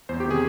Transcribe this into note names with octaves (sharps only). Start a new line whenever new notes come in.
E2 C5
G4
C3 D#3 G#4